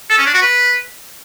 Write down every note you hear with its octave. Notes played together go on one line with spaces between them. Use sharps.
A4
C#4
D4
F#4
B4